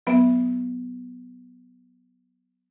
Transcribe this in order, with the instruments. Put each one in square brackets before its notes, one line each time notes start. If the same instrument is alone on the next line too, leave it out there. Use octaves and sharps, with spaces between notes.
[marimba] F#3 B3 B4 E5